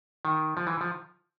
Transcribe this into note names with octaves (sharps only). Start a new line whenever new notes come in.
D#3
F3
E3
F3